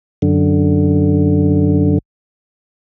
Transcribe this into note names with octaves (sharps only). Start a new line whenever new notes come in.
F#2 D3